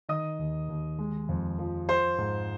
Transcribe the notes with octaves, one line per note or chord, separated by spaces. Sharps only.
D#3 D#5 D#6
D#2
D#2
G#3
F2
F3
F3 C5 C6
G#2